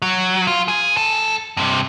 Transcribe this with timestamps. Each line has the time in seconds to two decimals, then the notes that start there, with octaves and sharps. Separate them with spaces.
0.02 F#3
0.47 F4
0.68 G#4
0.97 F#2 A4
1.57 G2 C3